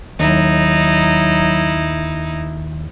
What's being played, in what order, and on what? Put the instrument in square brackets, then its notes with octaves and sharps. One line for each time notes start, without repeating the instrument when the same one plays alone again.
[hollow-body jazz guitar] D#2 [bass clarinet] F#3 [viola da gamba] D#4 E4